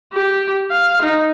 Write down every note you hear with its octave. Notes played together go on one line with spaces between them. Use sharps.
G4
F5
D#4